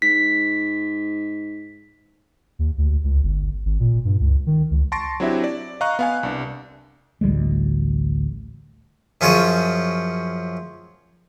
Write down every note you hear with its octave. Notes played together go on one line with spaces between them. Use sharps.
G#2 B6
D#2
D2
C#2
G1
G#1
A#2
G2
C#2
D#3
C#2
A5 C6 C#6 A6 A#6 D7
F#3 C4 D4 E4 G4 E5
D5
D#5 F5 A#5 C#6 F#6
B3 F5 G#5
C2 D4
A1 D2 G3 G#3
F#2 F3 C#4 F4 G#4 C#5